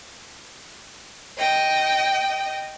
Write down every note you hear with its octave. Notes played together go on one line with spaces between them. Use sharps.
D#5 G5